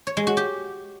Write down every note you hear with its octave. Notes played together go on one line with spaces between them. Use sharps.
C#5
G#3
F#4
G4